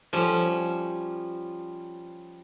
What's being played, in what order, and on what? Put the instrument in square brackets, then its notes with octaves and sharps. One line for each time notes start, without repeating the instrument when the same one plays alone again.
[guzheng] F3 G3 C#4